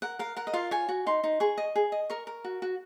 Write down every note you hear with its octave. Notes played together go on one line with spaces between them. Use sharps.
A#4 F#5
A#4 F5
A#4 F#5
D#5
F4 F5
C#5 G#5
F#4
D#4 C6
D#4
G#4 C#6
D#5
G#4
D#5
A#4 C#6
A#4
F#4
F#4